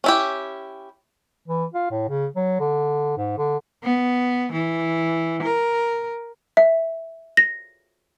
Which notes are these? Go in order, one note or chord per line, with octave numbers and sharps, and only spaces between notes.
C#4 E4 G4
E3
F4
A2
C#3
F#3
D3
G#2
D3
B3
E3
A#4
E5
A#6